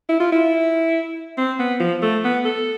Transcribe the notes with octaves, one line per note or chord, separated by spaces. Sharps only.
E4
F4
E4
C4
B3
F3
A3
B3
A4